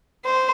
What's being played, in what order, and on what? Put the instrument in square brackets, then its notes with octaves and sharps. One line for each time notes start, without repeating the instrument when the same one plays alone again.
[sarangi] C5